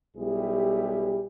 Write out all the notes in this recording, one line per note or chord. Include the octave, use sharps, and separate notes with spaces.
B1 G3 E4 G4 G#4 B4